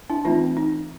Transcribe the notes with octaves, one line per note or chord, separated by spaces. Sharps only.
D4 E4
E3 A3 C4 D#4 F4
D#4